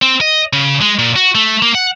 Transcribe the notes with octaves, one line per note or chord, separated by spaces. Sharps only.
C4
D#5
C#3
G#3
A#2
F#4
A3
A#3
F#5